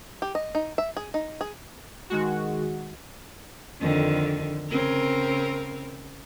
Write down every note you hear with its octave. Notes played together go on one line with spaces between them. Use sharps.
G4
D#5
D#4
E5
G#4
D#4
G#4
D#3 G#3 F#4
F2 D3 D#3
C#3 C4 A#4